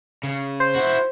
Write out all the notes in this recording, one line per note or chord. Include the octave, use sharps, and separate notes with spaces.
C#3
C5
E4 F#4